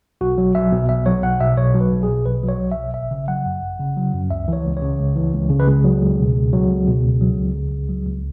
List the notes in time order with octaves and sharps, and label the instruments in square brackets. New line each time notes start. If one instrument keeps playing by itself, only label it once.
[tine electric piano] B1 F#4
F#3
B1 E5
B2
B1 E5
F#3 C#5
B1 F#5
B2 E5
B1 C#5
F#3
B4
B1
G#4
B2
B1 B4
F#3
C#5
B1
E5
B2
G#1 E5
C#3
F#3 F#5
F#2
G#1
C#3
F#3
F#2
C#2 E5
E3 C#5
C#2
C#5
C#3
C#2
E3
C#2
C#3
B4
C#2 G#4
F#3
C#2
B2
C#2
F#3
C#2
B2
C#2
F#3
C#2
C#3
C#2
F#3
C#2